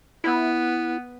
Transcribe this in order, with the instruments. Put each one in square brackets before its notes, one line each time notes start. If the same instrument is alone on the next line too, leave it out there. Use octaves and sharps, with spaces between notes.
[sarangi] B3 [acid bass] E4